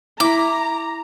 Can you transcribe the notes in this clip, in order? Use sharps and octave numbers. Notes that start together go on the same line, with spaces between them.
E4 A#5 B5 D6